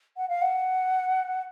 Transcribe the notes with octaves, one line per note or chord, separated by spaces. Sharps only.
F#5
F5
F#5